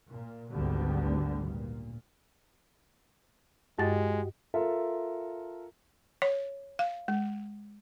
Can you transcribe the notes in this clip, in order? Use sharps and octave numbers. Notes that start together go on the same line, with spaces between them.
A#2
G#1 D2 D3 G3 B3
A#2
G2 G#3 F#4 G4 D#5 A6
F4 A4 A#4 E5
C#5
F5
G#3